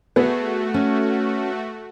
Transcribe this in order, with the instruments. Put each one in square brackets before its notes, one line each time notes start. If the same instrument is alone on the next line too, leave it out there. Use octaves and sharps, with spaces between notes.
[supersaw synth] A3 F#4 [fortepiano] B3 [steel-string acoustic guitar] G#4
[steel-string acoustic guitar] C#4